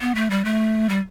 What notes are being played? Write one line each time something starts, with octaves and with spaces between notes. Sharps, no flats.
B3
A3
G3
A3
G3